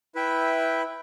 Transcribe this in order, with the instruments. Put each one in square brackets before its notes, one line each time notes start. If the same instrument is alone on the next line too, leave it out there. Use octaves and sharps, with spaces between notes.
[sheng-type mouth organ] E4 B4 E5 G5